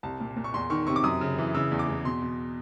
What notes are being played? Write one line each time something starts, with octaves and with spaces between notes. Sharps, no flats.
C2 A5
A#2
A#2
C#6
E2 C6
D#3 C#6
C3 C#6
D6
F#2 D#6
C#3
E3
C#3 E6
E2
D6
E2
B2 C6
B2